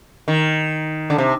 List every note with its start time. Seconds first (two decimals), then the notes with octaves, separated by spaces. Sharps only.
0.28 D#3
1.10 D3
1.18 C3